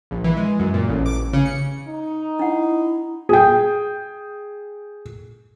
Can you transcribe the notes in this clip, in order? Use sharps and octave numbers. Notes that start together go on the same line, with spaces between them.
A#1
E3
G#3
F#2
A#2
A1
D6
A1
C#3
C#7
D#4
D4 E4 F#5
G#4 G5